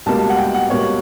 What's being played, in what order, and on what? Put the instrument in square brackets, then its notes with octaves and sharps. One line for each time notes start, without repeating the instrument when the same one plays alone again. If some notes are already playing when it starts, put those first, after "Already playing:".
[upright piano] C#2 B2 G3 A#3 A5
F#5
G5
F#5
C#2 B2 G3 A#3 C#5